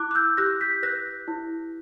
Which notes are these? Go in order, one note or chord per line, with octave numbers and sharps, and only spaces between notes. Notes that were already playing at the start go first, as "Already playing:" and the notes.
Already playing: E4 D6 F#6
F#6
E6 G6
G4 F#6 A#6
G6 B6
B4 F#6 A#6
E4